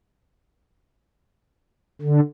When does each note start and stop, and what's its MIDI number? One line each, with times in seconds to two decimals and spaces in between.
2.02 2.20 50